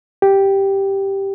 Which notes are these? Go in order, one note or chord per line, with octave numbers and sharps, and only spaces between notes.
G4